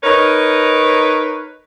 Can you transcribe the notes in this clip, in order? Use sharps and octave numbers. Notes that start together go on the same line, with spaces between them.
D#4 A#4 B4 C#5